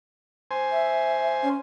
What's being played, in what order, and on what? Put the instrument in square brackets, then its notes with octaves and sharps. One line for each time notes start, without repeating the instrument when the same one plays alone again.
[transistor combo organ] C5 G#5
[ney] E5
C#4